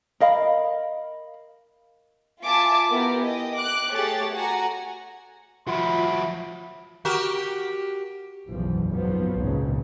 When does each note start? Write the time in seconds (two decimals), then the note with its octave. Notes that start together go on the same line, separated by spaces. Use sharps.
0.20 A#4 D#5 F5 B5
2.43 F4 E5 G#5 A5 D6
2.89 B3 E4 G4 A#4
3.26 D#5 G5
3.57 D6 F#6
3.91 A3 G4 G#4 C#5 A6
4.34 F#4 F#5 G#5 A#5
5.67 F3 F4 F#4 E5 B5
7.05 F#4 G4 A#4
8.48 F#1 B1 E2 F3
8.91 G#1 F3 F#3 B3
9.34 G#1 C#2 A#2 C#3